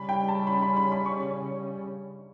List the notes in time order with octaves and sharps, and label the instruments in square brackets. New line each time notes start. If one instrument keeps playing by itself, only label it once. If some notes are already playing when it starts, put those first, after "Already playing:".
Already playing: [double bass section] C#3 G3 C#4 [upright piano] B5
[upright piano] G5
A5
B5
B5
B5
B5
C#6